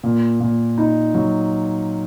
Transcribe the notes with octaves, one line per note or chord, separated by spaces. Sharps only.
A#2
A#2
D#4
F#3